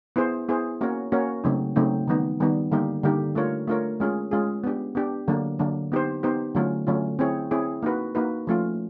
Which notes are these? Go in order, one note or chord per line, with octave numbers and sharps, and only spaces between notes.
B3 E4 G#4 C5
B3 E4 G#4 C5
A#3 C#4 F#4 A#4 C#5
A#3 C#4 F#4 A#4 C#5
C#3 F#3 A3 C4 D#4
C#3 F#3 A3 C4 D#4
D#3 G3 B3 D#4
D#3 G3 B3 D#4
D3 G3 A#3 D#4 G4
D3 G3 A#3 D#4 G4
A3 D4 F4 A#4 C#5
A3 D4 F4 A#4 C#5
G#3 C#4 F4 G#4
G#3 C#4 F4 G#4
B3 D4 G4
B3 D4 G4
D3 F#3 A#3 D4
D3 F#3 A#3 D4
B3 D#4 G4 C5
B3 D#4 G4 C5
D3 F#3 A3 C#4 F4
D3 F#3 A3 C#4 F4
C4 E4 G#4 C#5
C4 E4 G#4 C#5
A#3 D#4 F#4 B4
A#3 D#4 F#4 B4
F3 A3 C#4 F4